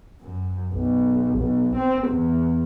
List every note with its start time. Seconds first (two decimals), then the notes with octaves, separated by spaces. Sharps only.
0.21 F#2
0.73 B1
1.38 B1
1.76 C4
2.08 E2